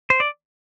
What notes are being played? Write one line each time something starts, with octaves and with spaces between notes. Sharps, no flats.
C5
D5